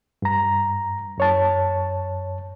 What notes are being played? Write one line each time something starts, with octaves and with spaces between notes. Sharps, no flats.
G2 A#5
F#2 C#5 A5